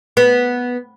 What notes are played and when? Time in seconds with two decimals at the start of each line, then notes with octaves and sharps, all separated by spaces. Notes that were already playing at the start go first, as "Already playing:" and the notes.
0.17 B3